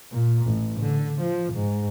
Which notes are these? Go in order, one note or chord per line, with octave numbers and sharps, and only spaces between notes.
A#2
A1
D3
F3
G#2